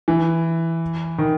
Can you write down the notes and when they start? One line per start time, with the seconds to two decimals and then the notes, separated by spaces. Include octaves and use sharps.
0.08 E3
1.18 D#3